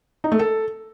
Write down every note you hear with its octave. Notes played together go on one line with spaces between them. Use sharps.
D#4
A3
A4